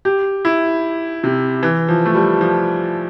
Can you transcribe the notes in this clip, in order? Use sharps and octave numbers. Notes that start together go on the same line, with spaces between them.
G4
E4
C3
E3
F3
A3
G3
F3